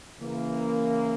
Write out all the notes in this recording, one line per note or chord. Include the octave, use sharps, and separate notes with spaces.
C#3 E3 A#3